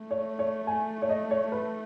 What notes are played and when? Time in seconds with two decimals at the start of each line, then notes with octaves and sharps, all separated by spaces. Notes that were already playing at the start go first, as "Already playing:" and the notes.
Already playing: A3
0.11 C#5
0.39 C#5
0.67 G#5
1.02 C#5
1.09 D#5
1.31 C#5
1.52 B4